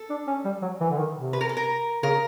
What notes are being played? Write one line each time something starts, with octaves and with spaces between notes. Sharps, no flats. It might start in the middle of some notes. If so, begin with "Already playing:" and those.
Already playing: A4
D4
C#4
G3
F#3
E3
D3
D#3
C3
B4
A#4
A4
A#4
C#3 A#4